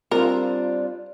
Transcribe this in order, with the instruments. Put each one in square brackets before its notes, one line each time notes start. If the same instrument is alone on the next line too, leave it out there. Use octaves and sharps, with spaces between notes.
[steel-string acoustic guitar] G3 C4 D4 [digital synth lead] F4 [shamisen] A#4